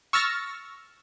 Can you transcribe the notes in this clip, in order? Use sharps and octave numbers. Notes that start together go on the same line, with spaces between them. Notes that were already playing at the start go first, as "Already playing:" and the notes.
C#6 E6 F6 A6 A#6